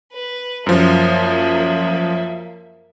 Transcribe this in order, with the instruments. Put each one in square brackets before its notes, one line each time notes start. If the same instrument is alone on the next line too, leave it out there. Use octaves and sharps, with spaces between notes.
[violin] B4
[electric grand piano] F#2 F3 [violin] A#3 E5